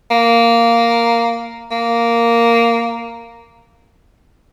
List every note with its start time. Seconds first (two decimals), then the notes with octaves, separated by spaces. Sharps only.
0.11 A#3
1.71 A#3